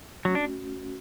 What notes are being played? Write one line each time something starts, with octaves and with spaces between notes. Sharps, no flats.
F#3 A3 C#4 F#4
D4